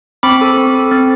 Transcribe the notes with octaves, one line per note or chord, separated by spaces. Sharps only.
C4 B5 D6
A4
C4
A4
C4